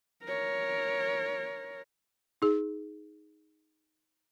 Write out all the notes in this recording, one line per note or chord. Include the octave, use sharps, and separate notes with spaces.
A#4 C#5
D#4 G#4